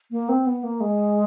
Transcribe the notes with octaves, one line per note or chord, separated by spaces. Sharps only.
A#3
C4
B3
A#3
G#3